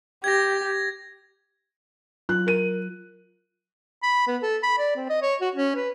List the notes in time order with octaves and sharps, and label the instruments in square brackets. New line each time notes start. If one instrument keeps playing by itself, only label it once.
[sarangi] G4 [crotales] G#6 A#6
[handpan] F#3 F4 [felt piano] F#6
[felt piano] A#4 D#7
[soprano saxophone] B5
B3
A4
B5
D5
C4
D#5
C#5
F#4
C#4
B4